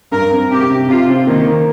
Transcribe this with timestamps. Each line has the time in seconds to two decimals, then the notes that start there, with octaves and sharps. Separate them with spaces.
0.12 G2 A#4
0.31 C4
0.51 C3 G4
0.70 C3
0.88 C3 F4
1.09 C4
1.27 D#3 A#3
1.46 A#3